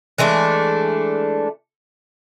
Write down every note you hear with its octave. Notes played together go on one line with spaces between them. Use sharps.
E3 G#3 A3 D4